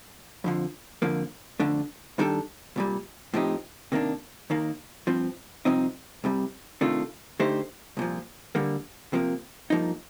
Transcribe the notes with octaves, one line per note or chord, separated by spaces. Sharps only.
F2 D3 F3
F2 D3 F3 A#3
F2 D3 A3 D4
G2 D#3 G3 D4 A4
C2 A#2 G3
A2 F3 C4 D#4 G4
C3 D#3 A#3 D4
D#2 D#3 A#3
G2 F3 C4
C2 C3 F3 C4 D#4
C2 C3 G3
C3 D#3 A3 D4 F4
D3 A3 D#4 G4 C5
C2 A#2 F3
D3 G3 A#3
C3 F3 A#3
G2 F3 A#3 D#4